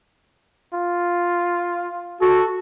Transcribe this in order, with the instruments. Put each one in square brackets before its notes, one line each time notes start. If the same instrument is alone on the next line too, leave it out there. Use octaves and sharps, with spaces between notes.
[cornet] F4
[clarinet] F#4 [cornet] A4